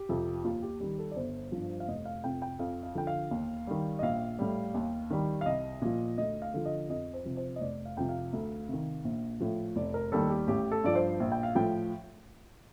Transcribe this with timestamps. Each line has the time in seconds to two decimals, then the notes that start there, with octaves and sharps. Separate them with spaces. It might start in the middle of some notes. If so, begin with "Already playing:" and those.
Already playing: G4
0.09 F2 C3 F3
0.44 D#2 F4
0.62 G4
0.80 D#3 G3 G4
0.99 A4
1.11 D5
1.16 G1 C5
1.52 G2 F3
1.80 F5
1.88 F1 D#5
2.05 F5
2.24 F2 C3 G5
2.42 G5
2.59 F2 F5
2.83 F5
2.95 D3 F3 G5
3.07 F5
3.31 D#2
3.67 D#3 G3
3.99 D#5
4.02 A#1 F5
4.39 A2 G3
4.74 D#2
5.10 D#3 G3
5.41 F5
5.46 C2 D#5
5.82 A#2 F3
6.18 D2 D#5
6.42 F5
6.54 D3 F3
6.65 D#5
6.89 F2 D#5
7.14 C5
7.25 C3 F3
7.37 C5
7.56 D#5
7.61 F1 D5
7.85 F5
7.97 F2 C3 F3 G5
8.09 F5
8.33 D2
8.68 C3
8.73 D#3
9.05 A#1
9.40 A2 F3
9.76 F1 D5
9.94 A#4
10.12 D#2 D#3 G3 A4
10.30 G4
10.48 A1 G4
10.72 A4
10.84 G2 F3 D5
10.95 C5
11.20 A#1
11.32 G5
11.43 F5
11.55 A2 F3 G5